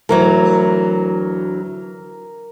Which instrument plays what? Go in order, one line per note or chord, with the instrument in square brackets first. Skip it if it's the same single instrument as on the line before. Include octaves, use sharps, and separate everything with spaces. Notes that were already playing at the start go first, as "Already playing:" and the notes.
[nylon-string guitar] D2 E3 F#3 [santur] A#4